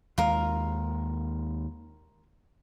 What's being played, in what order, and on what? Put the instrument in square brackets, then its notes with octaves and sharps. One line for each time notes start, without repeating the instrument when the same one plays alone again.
[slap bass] D#2 G#3 [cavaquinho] F4 A#4